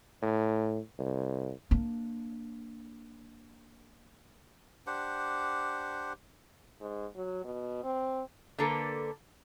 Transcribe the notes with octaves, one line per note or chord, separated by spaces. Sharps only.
A2
C2
A#3 D4
D4 G4 C5 F#5
G#2
F#3
B2
C4
D3 A#3 A4 B4